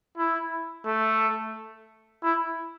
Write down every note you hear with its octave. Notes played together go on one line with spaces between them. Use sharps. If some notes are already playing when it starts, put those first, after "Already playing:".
E4
A3
E4